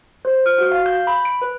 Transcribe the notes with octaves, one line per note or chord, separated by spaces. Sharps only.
C5
F6
F#4
F5
G6
B5
D7
B4